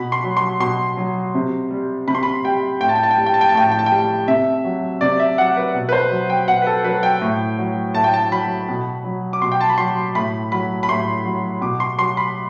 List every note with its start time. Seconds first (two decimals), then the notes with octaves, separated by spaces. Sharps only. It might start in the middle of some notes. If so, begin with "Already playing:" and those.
Already playing: B2 B5
0.12 C6
0.24 F#3
0.37 C6
0.60 B2 C6
0.97 F#3
1.35 C3
1.71 G3
2.07 C3 B5
2.15 C6
2.23 B5
2.44 G3 G5
2.81 A2 G5
2.89 A5
2.95 G5
3.03 A5
3.11 G5
3.17 G3 A5
3.26 G5
3.34 A5
3.41 G5
3.49 A5
3.55 A2 G5
3.64 A5
3.71 G5
3.79 A5
3.86 G3 G5
4.28 C3 E5
4.64 F#3
5.01 C3 D5
5.19 E5
5.38 F#3 F#5
5.57 B4
5.75 B2
5.89 B4
5.93 C5
6.11 F#3
6.30 G5
6.48 B2 F#5
6.62 B4
6.67 A4
6.84 F#3 B4
7.03 G5
7.21 A2
7.59 F#3
7.95 A2 A5
8.04 G5
8.14 A5
8.31 F#3 B5
8.68 B2
9.04 F#3
9.33 D6
9.41 B2 C6
9.52 G5
9.61 A5
9.70 B5
9.78 F#3 C6
10.15 A2 B5
10.52 F#3 B5
10.83 B5
10.89 A2 C6
11.25 F#3
11.61 B2 D6
11.80 C6
11.98 F#3 C6
12.17 B5